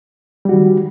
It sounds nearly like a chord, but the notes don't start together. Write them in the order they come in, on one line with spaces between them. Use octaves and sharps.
G3 F#4 D#3